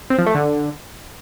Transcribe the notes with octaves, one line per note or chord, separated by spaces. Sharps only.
C4
F3
A3
D3